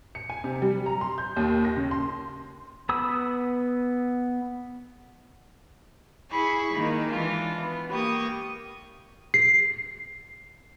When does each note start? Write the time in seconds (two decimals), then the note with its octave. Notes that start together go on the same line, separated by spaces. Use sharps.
0.15 C#7
0.30 G#5
0.44 C3
0.62 G3
0.86 A#5
1.01 C6
1.18 G6
1.36 D#2
1.65 A#6
1.77 C#3
1.91 C6
2.89 B3 B5 D#6 E6
6.30 E4 G#4 B5 C#6
6.73 D#3 A#3 D#4
7.09 E3 G#3 D4 F4
7.60 B3
7.91 A#3 G4 C#6 D#6
9.34 C7